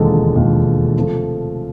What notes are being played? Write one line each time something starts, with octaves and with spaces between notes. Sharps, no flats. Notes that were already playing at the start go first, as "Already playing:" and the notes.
Already playing: E1 D#2 D3 F3 G#3 A4
E1 D#2 D3 F3 G#3
C3 F3 A3